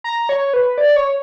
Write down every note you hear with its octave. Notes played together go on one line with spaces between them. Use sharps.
A#5
C#5
B4
D5
C#5